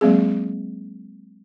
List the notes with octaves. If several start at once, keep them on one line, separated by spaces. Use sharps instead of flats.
F#3 G#3 A#3 C4 G#4